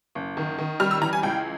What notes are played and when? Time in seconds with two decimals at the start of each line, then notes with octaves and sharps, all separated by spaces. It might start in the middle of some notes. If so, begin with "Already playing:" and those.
0.15 F#1
0.37 D#3
0.58 D#3
0.80 G3 F6
0.91 E6
1.01 E3 A#5
1.13 G#5
1.23 C#2 G5